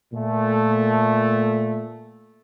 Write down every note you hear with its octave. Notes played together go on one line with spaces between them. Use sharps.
A#2 A3